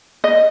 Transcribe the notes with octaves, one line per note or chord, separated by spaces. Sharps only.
D#5